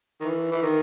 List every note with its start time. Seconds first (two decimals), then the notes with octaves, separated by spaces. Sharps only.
0.21 D#3
0.24 E3
0.51 E3
0.62 D#3